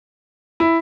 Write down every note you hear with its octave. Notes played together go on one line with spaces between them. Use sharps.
E4